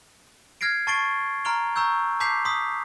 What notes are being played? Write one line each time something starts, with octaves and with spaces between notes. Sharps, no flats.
F6 G#6 A#6 C7 D7
A5 C#6 A6 C7 D7 G7
A#5 C6 F6 D7 F7 G7
A#5 C#6 E6 G6
A5 D6 G6 B6 C7 F7
C6 D#6 B6